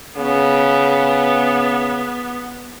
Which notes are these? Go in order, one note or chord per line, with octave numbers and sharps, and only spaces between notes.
C#3 B3